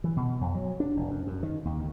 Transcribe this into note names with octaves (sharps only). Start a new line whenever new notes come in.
E3
B2
F2
F#3
D4
F1
F#2
F#2
D#3
D#2
D2